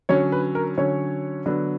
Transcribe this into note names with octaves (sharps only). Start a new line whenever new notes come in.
D3 F#3 C#4 C#5
B4
A#4
D3 F#3 C#4 C#5
D3 F#3 B3 D4